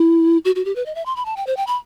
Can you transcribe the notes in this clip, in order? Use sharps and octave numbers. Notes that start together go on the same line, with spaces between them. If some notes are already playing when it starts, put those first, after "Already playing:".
Already playing: E4
F#4
F#4
G4
B4
D#5
E5
C6
B5
A5
G5
C5
G5
B5